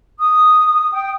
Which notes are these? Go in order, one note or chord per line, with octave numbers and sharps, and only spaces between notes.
D#6
G5